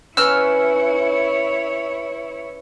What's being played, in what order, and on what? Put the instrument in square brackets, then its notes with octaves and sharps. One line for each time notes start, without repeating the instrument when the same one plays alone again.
[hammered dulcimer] C#4 B4 [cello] E4 C#5 [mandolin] E6 F6